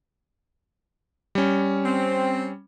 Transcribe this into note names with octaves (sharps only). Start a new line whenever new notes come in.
G3 C#4
C4